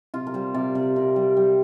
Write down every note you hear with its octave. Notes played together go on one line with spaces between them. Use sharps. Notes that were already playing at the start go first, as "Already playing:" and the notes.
C3 F4
A#4
G3 C5
C3 D5
C3 D5
C3 A#4
G3
G3